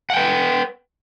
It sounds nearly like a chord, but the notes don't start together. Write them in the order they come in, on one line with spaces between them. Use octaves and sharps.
F#5 G5 B4